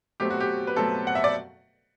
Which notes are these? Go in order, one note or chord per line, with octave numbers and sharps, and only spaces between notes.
B2 F#3 A3 C4 G4
F#4
G4
B4
B2 F#3 A3 C4 A4
F#5
E5
D5